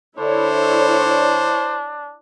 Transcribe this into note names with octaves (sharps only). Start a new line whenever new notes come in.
D3 D4 E4 C5 C#5